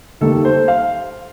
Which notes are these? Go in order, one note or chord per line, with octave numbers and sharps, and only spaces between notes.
D#2 D#3 G3 A#3 A4
C5
F5